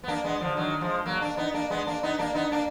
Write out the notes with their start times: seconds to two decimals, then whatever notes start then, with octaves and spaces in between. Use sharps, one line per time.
0.04 B3
0.08 A#3 D4
0.24 G#3 B3
0.40 D3 F3
0.57 D#3 F#3
0.81 F3 G#3
1.06 F#3 A#3
1.21 A#3 D4
1.37 B3 D#4
1.54 A#3 D4
1.70 G#3 B3
1.87 A#3 D4
2.03 B3 D#4
2.19 A#3 D4
2.35 B3 D#4
2.52 A#3 D4